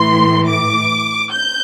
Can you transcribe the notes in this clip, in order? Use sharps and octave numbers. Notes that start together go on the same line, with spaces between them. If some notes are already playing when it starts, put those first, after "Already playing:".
Already playing: A2 E3 C6
D6
G6